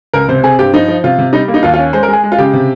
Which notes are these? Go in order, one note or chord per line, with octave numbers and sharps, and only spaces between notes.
C#2 A#4
C3 C5
C4 G#4
G2 G4
F3 D#4
F3
C3 F4
C3
G3 D#4
A#3
D#4
D#2 F4
F4
C#4
G#3 C5
A#4
G#3 G#4
G#3
F4
C#3 G4
C3